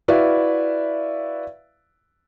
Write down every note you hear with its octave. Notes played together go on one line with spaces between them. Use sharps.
E4 F#4 B4 D5 E5 F5